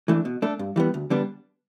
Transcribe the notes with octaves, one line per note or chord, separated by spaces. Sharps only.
E3 A3 D4
B2
A3 D4 A4
G2
E3 G3 B3
D2
D3 G3 B3 D4